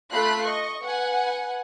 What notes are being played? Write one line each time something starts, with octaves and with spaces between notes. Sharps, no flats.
A3 F4 A4 B5 F#6 C7
D#5 C#6
B4 F#5 G#5